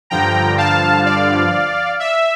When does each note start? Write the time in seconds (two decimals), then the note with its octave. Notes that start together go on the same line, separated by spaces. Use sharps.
0.10 G2 D3 F3 G5 A#5
0.58 F5 A5
1.05 D5 F5
2.00 E5